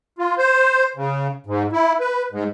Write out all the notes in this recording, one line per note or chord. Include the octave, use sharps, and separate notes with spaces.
F4
C5
C#3
G#2
E4
B4
G#2